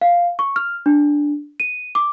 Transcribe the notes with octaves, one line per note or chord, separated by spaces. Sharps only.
F5
C#6
F6
D4
D#7
D6